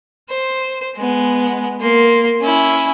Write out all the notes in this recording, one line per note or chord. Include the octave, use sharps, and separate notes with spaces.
C5
G#3 B3
A#3 C6
C#4 E4